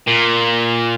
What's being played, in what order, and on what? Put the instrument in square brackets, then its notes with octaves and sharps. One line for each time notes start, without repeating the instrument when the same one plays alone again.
[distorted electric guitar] A#2